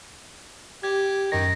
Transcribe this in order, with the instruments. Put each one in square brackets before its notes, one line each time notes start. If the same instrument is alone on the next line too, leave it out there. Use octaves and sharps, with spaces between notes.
[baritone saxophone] G4 [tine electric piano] G#6
[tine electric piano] F#2 A#6 [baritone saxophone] D#3